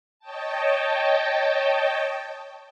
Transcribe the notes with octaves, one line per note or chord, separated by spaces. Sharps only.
C#5 D#5 G5 A5